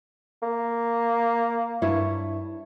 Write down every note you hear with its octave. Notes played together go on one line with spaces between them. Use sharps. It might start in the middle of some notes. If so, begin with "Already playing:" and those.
A#3
G2 E4 C#5